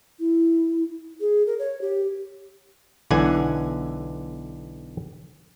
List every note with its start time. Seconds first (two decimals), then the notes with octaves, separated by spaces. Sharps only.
0.20 E4
1.20 G#4
1.47 A#4
1.59 C#5
1.81 G4
3.11 B1 D3 E3 F#5 G#5